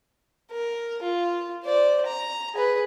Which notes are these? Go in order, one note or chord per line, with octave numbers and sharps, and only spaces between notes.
A#4
F4
C5 D5
A#5
G#4 B4